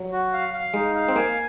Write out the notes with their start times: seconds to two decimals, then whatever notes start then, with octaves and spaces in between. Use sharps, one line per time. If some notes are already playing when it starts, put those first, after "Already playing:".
Already playing: F#3
0.12 F#4
0.33 F5
0.53 F5
0.74 G#3 D#4
0.95 F5
1.09 C4
1.16 A#3 G#5